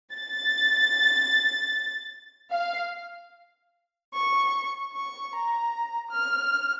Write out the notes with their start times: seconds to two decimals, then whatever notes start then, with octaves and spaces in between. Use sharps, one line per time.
0.13 A6
2.52 F5
4.13 C#6
4.92 C#6
5.34 A#5
6.09 F6